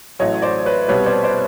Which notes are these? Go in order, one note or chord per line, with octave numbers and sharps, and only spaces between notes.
A1 A2 F#3 A3 C#5 D#5
C5 D5
B4 C#5
C2 B2 G3 B4 C#5
C5 D5
C5 D5